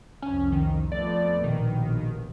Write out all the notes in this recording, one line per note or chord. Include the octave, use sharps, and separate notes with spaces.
C2 F2 C#4
D#3
F2 A3 B3 D5
A#1 D#2 B2 D#3